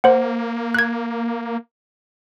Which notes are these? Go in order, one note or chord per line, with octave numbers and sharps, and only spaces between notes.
A#3 C5 F#5
F#6 G#6